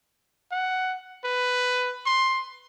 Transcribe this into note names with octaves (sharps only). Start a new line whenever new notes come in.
F#5
B4
C6